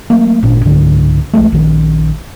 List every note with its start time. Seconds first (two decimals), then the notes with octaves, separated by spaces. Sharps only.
0.10 F#3 A3 A#3
0.43 G#1 A#2 C#4 D4
0.65 C#2 G#2 D3
1.33 B1 F3 G#3 A3
1.52 A#1 D#3